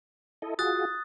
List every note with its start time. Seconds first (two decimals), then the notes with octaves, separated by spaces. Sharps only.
0.42 E4 A4 D#5
0.59 F4 F#4 G#4 D#6 F#6 A6